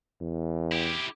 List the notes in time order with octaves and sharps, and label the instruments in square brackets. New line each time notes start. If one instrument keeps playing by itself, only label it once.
[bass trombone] E2
[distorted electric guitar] E4 G4